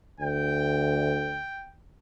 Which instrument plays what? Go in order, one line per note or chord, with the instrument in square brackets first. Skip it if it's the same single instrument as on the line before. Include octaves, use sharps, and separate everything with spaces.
[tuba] D2 [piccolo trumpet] G5